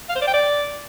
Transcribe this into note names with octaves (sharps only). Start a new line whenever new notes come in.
F5
C5
D5
G5
D5